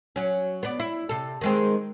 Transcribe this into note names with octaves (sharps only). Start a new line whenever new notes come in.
F#3 C#4
B3 D4
E4
C3 A4
D#3 G#3 C4